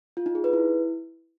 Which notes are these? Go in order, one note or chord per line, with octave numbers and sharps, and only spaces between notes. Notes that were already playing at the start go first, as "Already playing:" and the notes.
F4
D#4
G#4
B4
E4